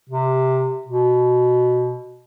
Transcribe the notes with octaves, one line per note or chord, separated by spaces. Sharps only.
C3
B2